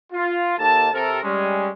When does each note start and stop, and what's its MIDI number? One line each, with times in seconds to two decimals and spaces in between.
0.13 0.55 65
0.59 0.89 39
0.59 0.89 58
0.59 0.89 63
0.59 0.89 69
0.59 0.89 81
0.94 1.23 48
0.94 1.23 69
0.94 1.23 70
1.23 1.69 55
1.23 1.69 56
1.23 1.69 61